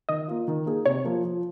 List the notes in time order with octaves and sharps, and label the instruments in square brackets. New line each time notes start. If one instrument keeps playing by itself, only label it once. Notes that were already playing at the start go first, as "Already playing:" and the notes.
[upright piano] D#3 [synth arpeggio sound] D#5
[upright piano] A#3 F4
D#3
A#3 D#4 G#4
[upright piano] C3 [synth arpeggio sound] C#5
[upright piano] F3 A#3
F3